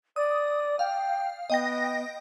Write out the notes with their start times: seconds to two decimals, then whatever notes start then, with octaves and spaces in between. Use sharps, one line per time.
0.16 D5 D#6
0.79 F5 G5
1.50 B3 D#5 G5 A#6